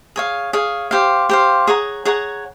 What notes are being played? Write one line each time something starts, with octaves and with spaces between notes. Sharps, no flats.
G#4 C#5 F5
G#4 C#5 F5
G4 C5 F5
G4 C5 F5
G#4 C#5 F#5 A#5
G#4 C#5 F#5 A#5